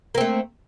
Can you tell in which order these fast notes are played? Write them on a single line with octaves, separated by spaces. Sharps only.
A#3 C4 A3